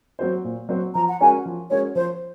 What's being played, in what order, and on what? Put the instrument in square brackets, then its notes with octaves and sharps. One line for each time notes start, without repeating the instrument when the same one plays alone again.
[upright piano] F#3 C4 F#4 C5
A#2
F#3 C4 F#4 C5
[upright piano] F3 [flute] A#5
[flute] F#5
[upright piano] G#3 C#4 F#4 A#4 [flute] G#5
[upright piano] F3
[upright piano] G#3 C#4 F#4 A#4 [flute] C#5
[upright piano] F3 [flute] C5